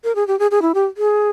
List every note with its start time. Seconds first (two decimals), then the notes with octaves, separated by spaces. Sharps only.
0.04 A#4
0.15 G#4
0.27 G4
0.39 G#4
0.51 G#4
0.62 E4
0.74 G4
0.97 G#4